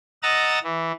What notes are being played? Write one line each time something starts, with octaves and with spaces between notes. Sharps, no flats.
D#5 F#5 A#5 D#6 E6 A6
E3